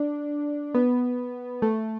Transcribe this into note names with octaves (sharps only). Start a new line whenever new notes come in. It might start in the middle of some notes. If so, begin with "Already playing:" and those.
Already playing: D4
B3
A3